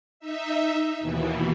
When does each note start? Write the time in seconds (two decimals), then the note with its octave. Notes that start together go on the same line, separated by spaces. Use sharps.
0.20 D#4 E5
1.00 D#2 B2 E3